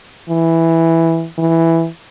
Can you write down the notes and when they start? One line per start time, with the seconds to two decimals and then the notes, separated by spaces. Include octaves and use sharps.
0.29 E3
1.38 E3